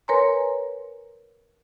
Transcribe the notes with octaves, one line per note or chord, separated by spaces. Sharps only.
A#4 B4 C#5 G#5 A#5 C6